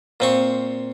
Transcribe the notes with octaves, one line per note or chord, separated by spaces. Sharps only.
A#2 C4 C#6